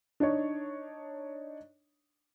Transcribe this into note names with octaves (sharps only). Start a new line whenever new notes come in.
D4 D#4 C#5